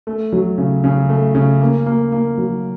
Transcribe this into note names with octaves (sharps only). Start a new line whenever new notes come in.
A3
F#3
C#3
C#3
A3
C#3
A#3
A#3
A#3
F#3